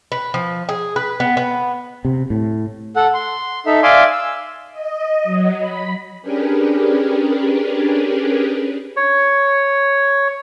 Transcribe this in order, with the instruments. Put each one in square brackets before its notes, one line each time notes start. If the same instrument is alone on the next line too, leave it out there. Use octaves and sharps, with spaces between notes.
[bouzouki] B4
F3
G#4
B4
B3
B3
[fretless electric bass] C3
A2
[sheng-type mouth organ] A4 F#5
C6
D#4 A4 E5
D5 E5 F5 G#5 C6 D6
E6
[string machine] D#5
F#3
B5
C#4 D4 G4 G#4 A#4 B4
[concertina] C#5